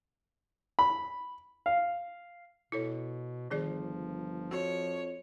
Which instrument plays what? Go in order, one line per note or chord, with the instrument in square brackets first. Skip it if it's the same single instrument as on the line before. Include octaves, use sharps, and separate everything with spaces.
[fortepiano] B5
F5
[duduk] B2 [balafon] E4 A4 C#5
[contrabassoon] G1 [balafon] D#3 G#4 D5 [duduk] F3
[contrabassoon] F2 [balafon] F#4 [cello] C#5